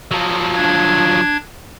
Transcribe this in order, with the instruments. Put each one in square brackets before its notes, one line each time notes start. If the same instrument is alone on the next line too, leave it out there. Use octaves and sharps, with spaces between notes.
[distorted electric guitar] F3 F#3
[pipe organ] D4 G#6